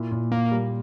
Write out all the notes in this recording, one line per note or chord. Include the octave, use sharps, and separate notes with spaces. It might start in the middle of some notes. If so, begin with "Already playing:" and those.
Already playing: A#2 E4
A#2
A#2 A#3
G3